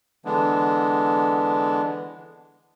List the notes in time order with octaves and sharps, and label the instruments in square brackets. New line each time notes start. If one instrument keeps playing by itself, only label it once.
[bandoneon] D3 E3 G#3 B3 D4